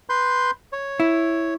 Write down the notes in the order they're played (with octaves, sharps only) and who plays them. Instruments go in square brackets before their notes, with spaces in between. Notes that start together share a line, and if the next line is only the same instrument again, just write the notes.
[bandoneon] B4 C6 G6
C#5
[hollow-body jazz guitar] E4